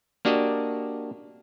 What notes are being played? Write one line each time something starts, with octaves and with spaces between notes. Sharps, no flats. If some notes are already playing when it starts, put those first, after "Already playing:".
A#3 D4 F#4 G4 D#5